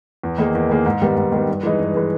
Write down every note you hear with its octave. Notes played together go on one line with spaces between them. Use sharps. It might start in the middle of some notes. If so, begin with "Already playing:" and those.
E2
D#3 A#3 D#4 G#4
E2
D#3 A#3 D#4 G#4
G#2
D#3 G3 B3
G#2
D#3 G3 B3
G2
E3 G#3 D#4
G2
E3 G#3 D#4